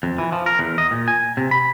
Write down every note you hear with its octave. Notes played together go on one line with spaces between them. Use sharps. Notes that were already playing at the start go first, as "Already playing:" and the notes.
F2
E3
F3
A#4
E2
D#5
A#2
G#5
C3
B5